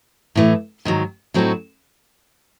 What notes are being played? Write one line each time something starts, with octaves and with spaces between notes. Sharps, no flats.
A2 E3 A3
G#2 D#3 F#3
A2 F#3 C4 D#4 F#4